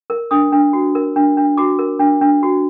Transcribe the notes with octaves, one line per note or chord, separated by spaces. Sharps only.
A#4
D4 D#6
D4
F#4
A#4
D4
D4
F#4 D6
A#4
D4
D4
F#4